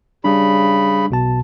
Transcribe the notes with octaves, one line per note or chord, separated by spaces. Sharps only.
C#3 G3 D4 B5
B1 B2 A5